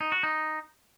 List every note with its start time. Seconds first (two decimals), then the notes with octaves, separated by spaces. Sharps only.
0.01 D#4
0.12 F#4
0.23 D#4